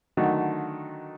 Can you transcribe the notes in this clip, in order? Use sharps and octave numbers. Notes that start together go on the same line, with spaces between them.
D3 D#3 F#3 A3 F#4